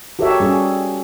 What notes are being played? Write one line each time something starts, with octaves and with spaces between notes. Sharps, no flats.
F#4 G4 A4 A#4 C#5 E5
G3 C#4 G#4